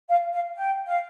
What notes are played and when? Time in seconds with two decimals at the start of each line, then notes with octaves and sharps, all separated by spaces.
0.09 F5
0.32 F5
0.56 G5
0.87 F5